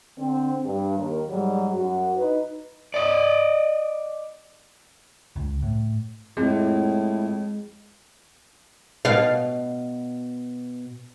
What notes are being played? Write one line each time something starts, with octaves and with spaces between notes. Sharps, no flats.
D3 C4
G2
D#2 A#4
G#2 F#3 G3
F#2 F#4
D#4 B4
D5 D#5
C#2
A2
F2 A2 G#3
B2 F5